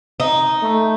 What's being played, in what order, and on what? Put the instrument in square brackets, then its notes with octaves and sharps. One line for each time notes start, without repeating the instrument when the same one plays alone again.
[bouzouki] D#4
[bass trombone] A3